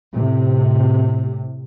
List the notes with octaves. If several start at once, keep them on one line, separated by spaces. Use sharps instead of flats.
A2 C3